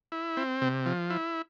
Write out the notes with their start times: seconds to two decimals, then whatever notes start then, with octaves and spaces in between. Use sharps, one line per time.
0.12 E4
0.37 C4
0.62 C3
0.86 F3
1.10 E4